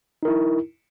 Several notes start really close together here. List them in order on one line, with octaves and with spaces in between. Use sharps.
D#4 A#4 E4